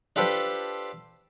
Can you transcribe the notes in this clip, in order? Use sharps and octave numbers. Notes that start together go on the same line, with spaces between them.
D4 F4 G4 A4 B4 C5